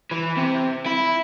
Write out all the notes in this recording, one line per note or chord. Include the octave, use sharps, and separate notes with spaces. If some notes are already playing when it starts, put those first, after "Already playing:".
E3
C3
E4